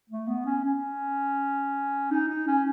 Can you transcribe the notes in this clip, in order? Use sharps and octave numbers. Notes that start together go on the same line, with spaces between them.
A3
B3
C#4
C#4
D#4
D#4
C#4